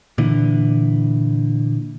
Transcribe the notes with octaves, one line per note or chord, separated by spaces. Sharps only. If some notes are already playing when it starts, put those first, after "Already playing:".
A#2 D3 E3